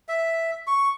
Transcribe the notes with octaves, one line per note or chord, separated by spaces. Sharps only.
E5
C#6